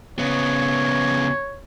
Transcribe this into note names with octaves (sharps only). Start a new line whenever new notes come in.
C#3 B3 C#5